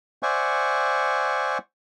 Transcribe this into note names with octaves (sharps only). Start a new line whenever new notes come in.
C5 D5 E5 F#5 G#5 C#6